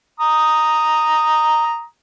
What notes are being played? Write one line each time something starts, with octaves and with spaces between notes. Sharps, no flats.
A#5 D#6